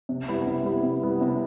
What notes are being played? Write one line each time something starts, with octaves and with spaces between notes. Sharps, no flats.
C3
G3 B3 E4
C3
G3 B3 E4
C3
G3 B3 E4
C3